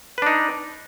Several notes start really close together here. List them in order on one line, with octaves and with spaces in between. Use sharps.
B4 D4 D#4